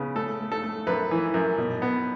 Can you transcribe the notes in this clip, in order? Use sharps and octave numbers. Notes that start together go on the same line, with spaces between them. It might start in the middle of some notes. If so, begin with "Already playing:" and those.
Already playing: C#3 B3
A3 A4
A3
A4
A3
F#2 B4
E3
F#2
B2
B3